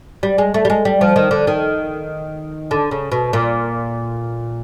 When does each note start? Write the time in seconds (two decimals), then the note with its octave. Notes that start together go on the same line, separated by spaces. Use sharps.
0.23 G3
0.38 G#3
0.54 A3
0.65 G3
0.70 G#3
0.85 G3
1.01 F3
1.16 D#3
1.31 D3
1.47 D#3
2.71 D3
2.91 C#3
3.12 B2
3.33 A#2